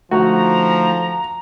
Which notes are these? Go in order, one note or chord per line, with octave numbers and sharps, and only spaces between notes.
D3 F3 A3 D#4 F#4 A#5